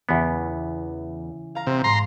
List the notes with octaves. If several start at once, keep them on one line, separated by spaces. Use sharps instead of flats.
E2 C#3 E3 B3
F5 A#5 A#6
C3
G#2 A#5 C6